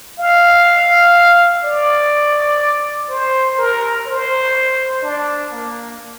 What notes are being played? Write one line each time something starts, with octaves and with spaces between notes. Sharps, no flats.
F5
D5
C5
A#4
C5
D4
A#3